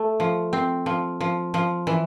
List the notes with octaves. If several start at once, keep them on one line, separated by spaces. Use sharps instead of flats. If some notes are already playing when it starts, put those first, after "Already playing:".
Already playing: A3
F3
C4
F3
F3
F3
E3